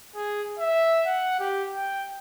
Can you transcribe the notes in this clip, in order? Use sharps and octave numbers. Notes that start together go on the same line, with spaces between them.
G#4
E5
F#5
G4
G5